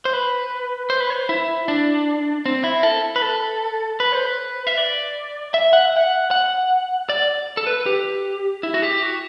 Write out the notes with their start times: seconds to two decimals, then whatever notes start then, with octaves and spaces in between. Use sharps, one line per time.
0.05 C5
0.13 B4
0.90 C5
1.00 B4
1.10 C5
1.29 E4
1.68 D4
2.46 C4
2.64 E4
2.83 A4
3.16 B4
3.22 A4
4.00 B4
4.12 C5
4.26 B4
4.67 E5
4.77 D5
5.54 E5
5.73 F#5
5.86 E5
5.96 F#5
6.31 F#5
7.09 D5
7.57 A4
7.67 B4
7.86 G4
8.63 E4
8.74 F#4
8.82 G4
9.03 F#4